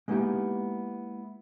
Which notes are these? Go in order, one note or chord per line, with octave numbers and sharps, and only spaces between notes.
G#3 A#3 B3 D#4 E4 G4